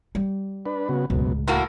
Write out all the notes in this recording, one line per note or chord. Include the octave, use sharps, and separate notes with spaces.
G3
D4 B4
C#3 B3 F#4
D1 C#2 F#2 B2
A2 A#3 F#4 A#5